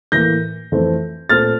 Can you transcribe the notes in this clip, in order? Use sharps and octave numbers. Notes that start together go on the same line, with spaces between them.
A2 E3 A#3 G6 A#6
F2 E3 A3 C4
A#2 A3 C4 F6 A6